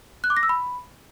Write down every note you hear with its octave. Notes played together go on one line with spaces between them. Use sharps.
F#6
D6
A#6
E6
B5